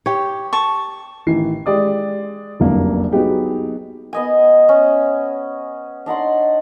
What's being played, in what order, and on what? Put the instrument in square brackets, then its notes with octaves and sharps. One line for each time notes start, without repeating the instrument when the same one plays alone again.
[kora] G4 C#5
[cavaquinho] A5 C#6
[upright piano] A1 D#3 E3 C7
G#3 G4 D5 D#6
F1 C2 F#2 A#3 D4
F#3 B3 D#4 G4 G#4
[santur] B3 D#5 G#5
C#4
D4 D#4 F#5 C6